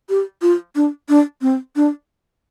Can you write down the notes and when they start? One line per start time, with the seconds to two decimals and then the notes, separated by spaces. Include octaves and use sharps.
0.09 G4
0.42 F4
0.76 D4
1.09 D4
1.42 C4
1.76 D4